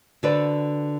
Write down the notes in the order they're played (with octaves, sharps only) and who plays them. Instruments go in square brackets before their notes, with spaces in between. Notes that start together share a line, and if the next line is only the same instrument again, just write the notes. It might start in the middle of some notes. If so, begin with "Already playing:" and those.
[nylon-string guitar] D3 F#4 A4 B4 C5 D5